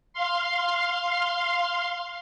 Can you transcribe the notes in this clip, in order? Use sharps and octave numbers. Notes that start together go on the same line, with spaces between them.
F5 C6